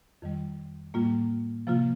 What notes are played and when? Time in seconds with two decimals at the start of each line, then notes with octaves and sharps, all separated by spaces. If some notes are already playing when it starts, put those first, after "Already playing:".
0.22 F2 D#3 G3
0.94 A2 G3 A#3 F4
1.67 C3 F3 A#3 F4